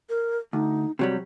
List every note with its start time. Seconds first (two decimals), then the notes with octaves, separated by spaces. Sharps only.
0.10 A#4
0.53 D2 D#4
0.99 C3 F#3 G3 F#4